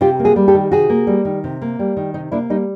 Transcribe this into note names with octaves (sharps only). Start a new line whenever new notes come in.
C3 F4 G4
A#3
F#4 G#4
G3
G4 A4
D#3
C3 F#4 G#4
A#3
G3
D#3
C3
A#3
G3
D#3
C3 D#4
A#3 D4 E4
G3 D#4